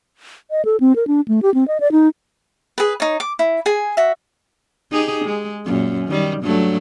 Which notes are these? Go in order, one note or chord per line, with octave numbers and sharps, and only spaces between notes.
D#5
A4
C4
A#4
D4
A3
G4
C4
D#5
D5
D#4
G#4 B4
D#4 C#5
D6
E4
G#4 G#5
F#4 E5
D#4 G4 G#4
G#3
F#2 A#2
D#3 G3
G2 F#3 A3